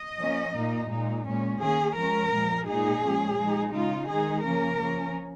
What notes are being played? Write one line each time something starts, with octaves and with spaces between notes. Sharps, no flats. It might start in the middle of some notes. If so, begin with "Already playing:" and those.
Already playing: D#5
F3 A#3 C#4
A#2 A#3 D#4
A#2 G#3 D#4
A#2 G#3 C#4
D#3 A#3 C#4 G#4
F3 G#3 C#4 A#4
A#2 F3 G#3
A#2 G#3 D#4 G#4
A#2 F3 G#3 C#4
F3 G#3 D#4
C#3 G#3 D#4 F4
D#3 G#3 D#4 G#4
C#3 F3 A#3 C#4 A#4
F3 C#4